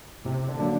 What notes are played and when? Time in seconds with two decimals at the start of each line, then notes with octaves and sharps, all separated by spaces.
0.25 A2 C3
0.40 C3
0.49 D3
0.60 F#3 A#3 D4